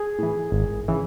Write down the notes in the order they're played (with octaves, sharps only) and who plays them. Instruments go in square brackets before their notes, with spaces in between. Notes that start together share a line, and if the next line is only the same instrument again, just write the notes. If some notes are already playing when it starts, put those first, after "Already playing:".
Already playing: [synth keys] G#4
A2 E3
G#1
C#3 E3